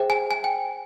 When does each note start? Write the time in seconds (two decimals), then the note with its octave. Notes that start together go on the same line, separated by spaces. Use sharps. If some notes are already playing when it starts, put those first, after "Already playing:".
Already playing: G#4 C5 E5 G5
0.10 G#5
0.31 G#5
0.44 G5